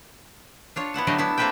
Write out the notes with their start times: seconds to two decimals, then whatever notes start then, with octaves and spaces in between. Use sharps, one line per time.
0.76 D4 F4 C#5
0.94 B3 E4 F#5 A5
1.07 D3 F#3 A3 G4 D5 D#5
1.18 B3 D4 E4 A5
1.38 A#3 C4 A4 B4 E5 G5